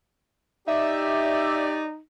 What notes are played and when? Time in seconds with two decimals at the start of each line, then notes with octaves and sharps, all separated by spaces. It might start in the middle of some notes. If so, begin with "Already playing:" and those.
0.68 D#4 G4 D5 E5